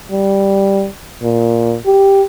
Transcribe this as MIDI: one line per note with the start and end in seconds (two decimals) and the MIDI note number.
0.11 0.87 55
1.22 1.75 46
1.86 2.23 67